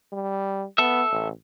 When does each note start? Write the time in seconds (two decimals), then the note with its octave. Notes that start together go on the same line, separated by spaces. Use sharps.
0.13 G3
0.78 B3 A4 E5
1.12 A1